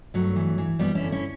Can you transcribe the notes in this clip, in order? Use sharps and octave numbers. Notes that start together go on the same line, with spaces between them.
G2 F#3 A3
E3
E3
F#2 G3 B3
C#4 E4
D3
C#4 E4